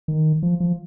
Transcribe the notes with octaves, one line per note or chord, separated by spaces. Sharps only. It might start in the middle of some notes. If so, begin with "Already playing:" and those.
D#3
F3
F3